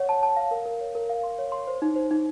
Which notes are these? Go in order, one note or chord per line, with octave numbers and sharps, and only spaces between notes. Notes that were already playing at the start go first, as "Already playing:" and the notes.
Already playing: C#5 F#5
A5
A5
F5
A#4
A#4
C#5
A#4
F5
C6
C#5
C6
C5
D#4
C5
D#4